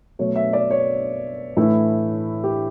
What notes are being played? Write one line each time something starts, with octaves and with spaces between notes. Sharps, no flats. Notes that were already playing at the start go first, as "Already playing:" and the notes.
B2 F#3 A3 C#5
E5
D5
C#5
A2 E3 A3 E4
G4